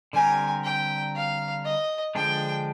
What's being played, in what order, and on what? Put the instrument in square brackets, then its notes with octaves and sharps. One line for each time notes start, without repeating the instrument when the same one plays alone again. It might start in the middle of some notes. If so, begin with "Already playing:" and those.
[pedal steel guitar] D3 G3 C4 G4 A#4 [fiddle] G#5
[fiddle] G5
F5
D#5
[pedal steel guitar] D3 F3 G#3 D4 [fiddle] G5